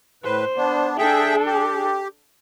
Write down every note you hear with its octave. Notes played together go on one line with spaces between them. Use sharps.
A2 B4 C5
B3 D4
D4 G#4 A4 E5 G5
G4